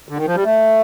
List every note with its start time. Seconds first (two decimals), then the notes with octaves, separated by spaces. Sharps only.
0.09 D3
0.17 D#3
0.27 F3
0.35 G3
0.44 A3